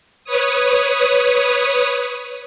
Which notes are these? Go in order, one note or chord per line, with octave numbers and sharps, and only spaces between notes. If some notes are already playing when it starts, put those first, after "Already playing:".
B4 C#5 D#6